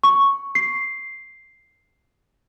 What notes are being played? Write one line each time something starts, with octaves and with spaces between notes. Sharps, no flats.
C#6
C7